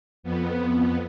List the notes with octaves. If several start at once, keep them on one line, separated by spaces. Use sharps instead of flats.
F2 B3